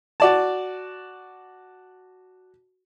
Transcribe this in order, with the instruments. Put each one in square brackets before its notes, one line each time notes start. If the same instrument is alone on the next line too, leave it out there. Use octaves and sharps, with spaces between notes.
[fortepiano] F#4 D5 A5